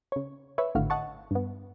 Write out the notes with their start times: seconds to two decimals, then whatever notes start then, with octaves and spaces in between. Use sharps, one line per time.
0.12 C#3 C#5
0.58 B4 C#5 E5
0.75 G#1 A2 D3 F#4 F5
0.90 D#5 F#5 A5 C#6
1.31 G2 B3